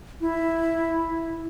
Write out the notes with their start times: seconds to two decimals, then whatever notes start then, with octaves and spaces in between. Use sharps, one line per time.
0.21 E4